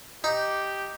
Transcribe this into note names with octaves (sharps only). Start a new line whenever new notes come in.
D#4 G4